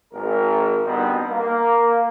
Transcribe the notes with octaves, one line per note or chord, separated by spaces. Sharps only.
G#1 A#4
B2 D3 G3 B3 C4 D#4
A#3